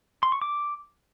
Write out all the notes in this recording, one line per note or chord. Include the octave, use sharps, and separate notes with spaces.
C6
C#6
D6